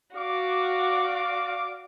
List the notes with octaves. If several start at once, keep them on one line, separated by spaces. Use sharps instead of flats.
F#4 D5 F5 D6